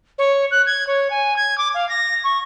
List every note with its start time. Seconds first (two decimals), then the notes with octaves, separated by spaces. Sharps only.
0.18 C#5
0.51 F#6
0.66 G#6
0.87 C#5
1.10 G#5
1.36 G#6
1.58 D6
1.74 F5
1.89 A#6
2.24 C#6